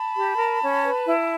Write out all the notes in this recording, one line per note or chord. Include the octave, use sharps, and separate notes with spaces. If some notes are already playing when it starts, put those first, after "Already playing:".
Already playing: A5 B5
G4
A#4
C#4
B4
E4